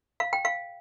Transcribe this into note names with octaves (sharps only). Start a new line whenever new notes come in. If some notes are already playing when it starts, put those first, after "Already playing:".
F5
G5
F5